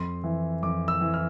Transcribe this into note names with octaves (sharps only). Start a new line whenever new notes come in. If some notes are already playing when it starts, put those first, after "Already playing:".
Already playing: F2 C6
E3
F2 D6
E6
E3
F6